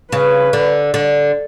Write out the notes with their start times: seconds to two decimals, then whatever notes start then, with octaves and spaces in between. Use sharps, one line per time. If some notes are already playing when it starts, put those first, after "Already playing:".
0.12 C#3 B4
0.53 D3
0.94 D3